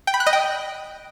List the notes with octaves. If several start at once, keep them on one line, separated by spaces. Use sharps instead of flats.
G5
B5
F#6
D#5
G5